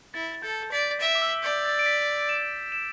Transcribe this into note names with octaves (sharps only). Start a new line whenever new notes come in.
E4 A6
A6
A4 G6
D5 B6
E5 D7
D6
E6
D5 G6
A6
D7
B6
E7
E7